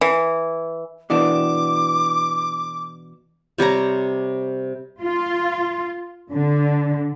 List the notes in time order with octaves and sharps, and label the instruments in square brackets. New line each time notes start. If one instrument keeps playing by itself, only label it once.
[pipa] E3
[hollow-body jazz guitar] B2 E3 D4 [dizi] D6
[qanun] C3 G3 C#5 A#5
[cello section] F4
D3